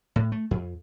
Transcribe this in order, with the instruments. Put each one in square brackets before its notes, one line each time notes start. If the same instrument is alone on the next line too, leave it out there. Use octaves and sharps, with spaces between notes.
[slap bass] A2
A3
F2